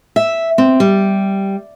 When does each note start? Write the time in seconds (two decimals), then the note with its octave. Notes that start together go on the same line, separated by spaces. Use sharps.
0.16 E5
0.58 C4
0.80 G3